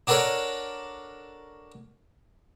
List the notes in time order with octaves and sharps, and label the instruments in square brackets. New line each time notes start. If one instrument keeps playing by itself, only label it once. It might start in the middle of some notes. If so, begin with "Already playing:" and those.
[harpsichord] D4 F#4 A4 A#4 C#5